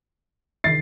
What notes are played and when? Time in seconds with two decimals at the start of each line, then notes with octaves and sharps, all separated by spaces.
0.64 D#3 A6 C7